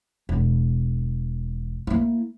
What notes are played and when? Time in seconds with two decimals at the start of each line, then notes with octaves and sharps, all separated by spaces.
0.29 E1
1.87 A#3 E4